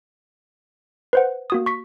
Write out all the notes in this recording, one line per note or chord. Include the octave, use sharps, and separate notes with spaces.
B4 C5 F#5
A#3 F#4 D#6
C#6 B6